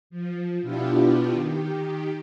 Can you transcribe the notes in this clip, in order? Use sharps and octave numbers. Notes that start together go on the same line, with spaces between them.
F3
B2 B3 D4 E4 F4 G4
D#3 G4